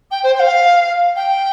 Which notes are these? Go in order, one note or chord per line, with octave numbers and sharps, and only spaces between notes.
G5
C5
G5
F5
G5